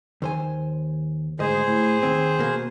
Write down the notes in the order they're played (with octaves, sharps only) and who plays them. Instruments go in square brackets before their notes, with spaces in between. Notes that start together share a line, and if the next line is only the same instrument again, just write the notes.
[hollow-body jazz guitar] D#2 C5 G#5
[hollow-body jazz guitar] D2 G#2 D#5 [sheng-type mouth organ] G#4 C5
[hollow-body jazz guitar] A2
D#2 C4
B2 A#3